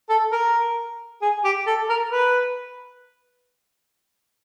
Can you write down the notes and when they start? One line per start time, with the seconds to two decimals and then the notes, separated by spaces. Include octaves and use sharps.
0.10 A4
0.32 A#4
1.22 G#4
1.44 G4
1.67 A4
1.89 A#4
2.12 B4